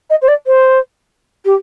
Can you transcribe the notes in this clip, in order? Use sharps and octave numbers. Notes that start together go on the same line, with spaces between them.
D#5
C5
D5
C5
G4